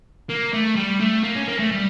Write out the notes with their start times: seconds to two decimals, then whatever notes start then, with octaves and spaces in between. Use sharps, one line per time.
0.29 A#3
0.53 A3
0.76 G3
1.00 A3
1.23 A#3
1.36 C#4
1.48 A#3
1.59 A3
1.71 G3